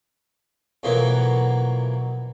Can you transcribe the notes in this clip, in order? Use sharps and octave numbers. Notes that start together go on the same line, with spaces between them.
F2 B2 E3 F#3 A#3 B3